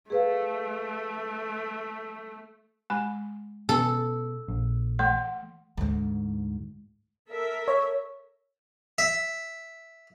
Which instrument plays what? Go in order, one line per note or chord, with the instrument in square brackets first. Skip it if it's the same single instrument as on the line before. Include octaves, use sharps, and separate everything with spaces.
[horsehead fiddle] A3 [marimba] G#4 B4 F5
[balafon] G#3 G#5 B5
[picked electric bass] B2 [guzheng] A4 [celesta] E6
[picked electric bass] A#1
[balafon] E3 A3 C6 [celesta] F#5
[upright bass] D2 G#2
[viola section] A4 A#4 E5
[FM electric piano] C#5
[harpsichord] E5